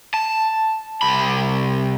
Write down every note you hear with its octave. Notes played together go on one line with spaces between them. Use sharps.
A5
C2 B5